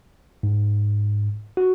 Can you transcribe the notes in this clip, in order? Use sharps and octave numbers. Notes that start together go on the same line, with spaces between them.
G#2
F#4